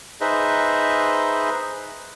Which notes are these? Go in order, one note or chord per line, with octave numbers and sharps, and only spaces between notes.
D#4 G#4 B4 C5 D#5 E5